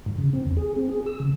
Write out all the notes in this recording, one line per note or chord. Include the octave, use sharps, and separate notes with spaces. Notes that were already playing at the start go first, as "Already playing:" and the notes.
G#2
C#3
C4
E2
G#4
C4
G#4
E6
C#3